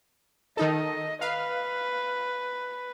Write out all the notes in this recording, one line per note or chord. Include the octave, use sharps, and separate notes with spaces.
D#3 D#4 A4 D#5
B4 F5